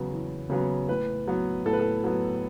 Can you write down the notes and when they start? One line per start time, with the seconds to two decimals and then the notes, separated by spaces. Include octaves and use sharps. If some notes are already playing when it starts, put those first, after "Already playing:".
Already playing: E2 C#3 F#3 B3
0.12 E2
0.50 C#3 F#3 B3
0.89 A2 B4
1.27 F#3 B3
1.66 A2 A4
1.73 B4
1.80 A4
2.04 F#3 B3